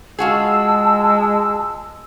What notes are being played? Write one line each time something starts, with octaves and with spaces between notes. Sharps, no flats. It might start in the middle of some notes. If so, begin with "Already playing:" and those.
G#3 F4 F#4 G#4 A5 E6